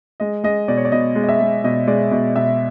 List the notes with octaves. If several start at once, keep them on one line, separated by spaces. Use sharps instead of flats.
G#3 D#5
G#3 D#5
B2 D5
C#5
D5
B2 D#5
G#3
D#5
E5
G#3
B2 D#5
G#3 D5
B2 D#5
B2 E5